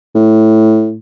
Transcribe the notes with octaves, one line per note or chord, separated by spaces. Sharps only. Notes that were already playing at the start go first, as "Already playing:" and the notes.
A2